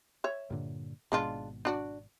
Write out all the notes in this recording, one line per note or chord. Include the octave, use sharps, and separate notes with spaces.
C#5 E5
G2 A#2 D3
G#1 G#2 B2 G#3 D4 F4
D4 F#4 D5